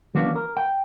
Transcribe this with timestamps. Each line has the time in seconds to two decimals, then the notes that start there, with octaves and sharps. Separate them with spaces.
0.15 E3 F#3 A#3 C#4 D4
0.36 A#4
0.57 G5